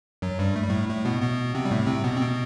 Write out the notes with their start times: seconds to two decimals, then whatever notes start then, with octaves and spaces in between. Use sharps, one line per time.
0.22 F#2 F#3
0.39 G2 G3
0.56 A3
0.63 G3
0.70 A2 A3
0.89 A2 A3
1.05 B2 B3
1.22 B2 B3
1.55 C3 C4
1.65 G3
1.71 A2 A3
1.87 C3 C4
2.04 B2 B3
2.17 C4
2.21 B2 B3